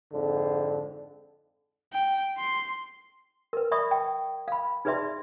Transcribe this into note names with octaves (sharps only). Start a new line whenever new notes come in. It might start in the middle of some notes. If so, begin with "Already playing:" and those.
F2 G#2 D3
G5
C6
A#4 B4
D5 E5 B5 C#6 D#6
G5
F5 B5
D#4 G#4 B4 D5 E5 C6